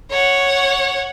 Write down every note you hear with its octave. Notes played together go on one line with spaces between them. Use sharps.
C#5 F#5